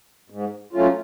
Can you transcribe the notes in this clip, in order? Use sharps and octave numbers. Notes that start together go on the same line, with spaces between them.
G#2
F#3 A3 C#4 F4